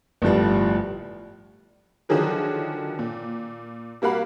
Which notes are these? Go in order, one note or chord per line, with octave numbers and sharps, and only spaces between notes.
G1 A2 F3 G3
D3 D#3 F3 F#3 G#4 A#4
A#2
G3 A#3 F#4 F5 B5